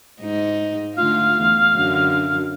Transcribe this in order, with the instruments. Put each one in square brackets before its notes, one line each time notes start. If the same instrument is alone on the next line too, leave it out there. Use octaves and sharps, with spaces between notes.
[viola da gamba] G#2 D#4
[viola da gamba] D3 A3 F4 [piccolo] F5
[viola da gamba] E2 A3
F#2 D3